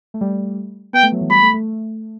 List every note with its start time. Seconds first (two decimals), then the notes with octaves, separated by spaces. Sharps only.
0.14 A3
0.21 G3
0.93 B3 G5
1.03 A3
1.12 F#3
1.21 E3
1.30 G3 B5
1.42 A3
1.54 A3